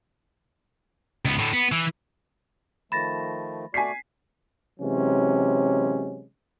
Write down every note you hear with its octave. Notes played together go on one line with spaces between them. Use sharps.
C#2 B3
A2 D3
B3
E3
D#3 F3 A3 B5 A6 A#6
A3 F#4 D5 G#5 B6 C7
C3 E3 F#3 G#3 C#4